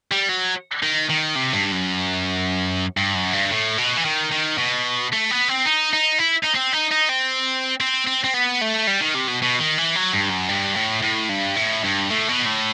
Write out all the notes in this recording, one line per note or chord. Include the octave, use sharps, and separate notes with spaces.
G3
F#3
D#3
D#3
C3
G2
F#2
G2
F#2
G2
A2
B2
E3
D#3
D#3
B2
A3
B3
C4
D#4
D#4
E4
D#4
C4
D#4
D#4
C4
C4
C4
C4
B3
A3
G3
D#3
C3
B2
B2
D#3
E3
F#3
G2
F#2
G2
A2
A2
G2
A2
G2
A2
B2
A2